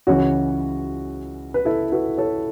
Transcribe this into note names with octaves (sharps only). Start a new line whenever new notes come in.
C#2 C#3 E3 C#4 F#4
B4
E4 A4
F#4 B4
A4 C#5